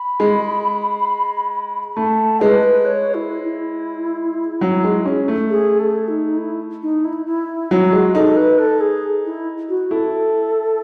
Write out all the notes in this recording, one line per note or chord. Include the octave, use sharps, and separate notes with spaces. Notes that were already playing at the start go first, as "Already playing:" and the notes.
Already playing: B5
G#3
B5
A3 A5
G#3 B4
C#5
E4
E4
F#3
G#3
C#4
A3
G#4
A4
D#4
E4
D#4
E4
E4
F#3 F#4
G#3
D#4 A4
B4
A4
G#4
E4
F#4
E4 A4